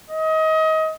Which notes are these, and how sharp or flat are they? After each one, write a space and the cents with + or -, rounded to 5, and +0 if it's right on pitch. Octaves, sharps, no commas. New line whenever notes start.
D#5 +25